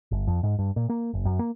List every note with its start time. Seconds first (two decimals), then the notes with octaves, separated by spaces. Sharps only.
0.11 G1
0.27 F2
0.43 G#2
0.59 G2
0.76 A#2
0.90 A#3
1.13 F#1
1.25 F#2
1.39 A#3